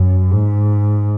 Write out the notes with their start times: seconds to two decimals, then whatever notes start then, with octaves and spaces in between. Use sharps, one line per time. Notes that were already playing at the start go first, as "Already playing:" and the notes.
Already playing: F#2
0.31 G#2